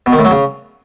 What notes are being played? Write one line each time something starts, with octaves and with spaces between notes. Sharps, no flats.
B2
D#3
A2
F#3
C#3